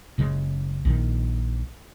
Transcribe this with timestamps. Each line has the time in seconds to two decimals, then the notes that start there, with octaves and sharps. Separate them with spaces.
0.18 F#1 C#3 G#3
0.85 A#1 D#3